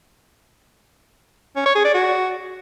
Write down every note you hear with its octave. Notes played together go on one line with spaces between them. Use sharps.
C#4
C#5
G#4
D5
F#4